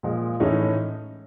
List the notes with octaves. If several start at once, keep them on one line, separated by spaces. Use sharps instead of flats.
A#2 F3 G#3
A2 E3 G#3 C#4 D#4